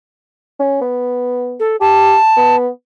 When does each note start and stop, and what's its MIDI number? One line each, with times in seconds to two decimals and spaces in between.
0.59 0.78 61
0.81 1.58 59
1.60 1.76 69
1.80 2.16 67
1.80 2.56 81
2.37 2.68 59